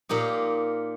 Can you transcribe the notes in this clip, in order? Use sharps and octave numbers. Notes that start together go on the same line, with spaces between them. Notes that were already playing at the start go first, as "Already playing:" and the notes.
A#2 A#3 D#4 G4